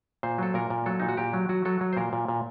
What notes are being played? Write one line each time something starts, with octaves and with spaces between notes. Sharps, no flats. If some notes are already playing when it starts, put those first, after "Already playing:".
A#2 C5
F#3 A4
A#2 A#4
A#2
F#3 A4
A#2 D#4
F#4
A#2 G4
F#3
F#3 F#4
F#3 A4
F#3
C5
A#2 A#4
A#2
A#2